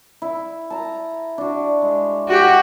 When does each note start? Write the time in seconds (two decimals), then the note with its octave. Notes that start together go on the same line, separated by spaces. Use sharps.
0.22 E4
0.70 A5 A#5
1.38 D4 F#4
1.82 G#3
2.28 F#4 G4